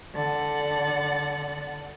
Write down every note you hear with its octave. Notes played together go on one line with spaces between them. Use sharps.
D3 F#5 A6